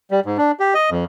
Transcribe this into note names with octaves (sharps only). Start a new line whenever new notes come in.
G3
G#2
D4
G4
D#5
F2